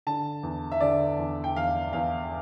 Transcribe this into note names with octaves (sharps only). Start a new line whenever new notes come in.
D3 A5
E2
E5
D3 D5
E2
G5
E2 F5
E2 F5